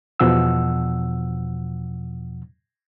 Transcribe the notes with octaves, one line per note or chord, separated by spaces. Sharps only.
E2 B2 F3 F#5 E6